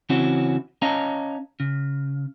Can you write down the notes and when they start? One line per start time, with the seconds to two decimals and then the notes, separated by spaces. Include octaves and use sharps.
0.09 C#3 E3 C4 C#4 E4 F#4
0.82 C#4 C#5 D#5 F5 A5 A#5
1.60 C#3